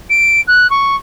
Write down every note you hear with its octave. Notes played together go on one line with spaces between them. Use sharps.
D7
F#6
C#6